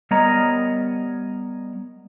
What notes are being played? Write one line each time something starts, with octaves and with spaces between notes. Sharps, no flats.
G3 B3 A#4 C#5 D#5 A#5